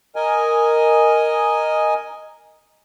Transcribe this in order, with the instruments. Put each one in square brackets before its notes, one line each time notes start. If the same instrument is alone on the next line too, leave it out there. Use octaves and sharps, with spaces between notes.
[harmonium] A#4 D#5 G#5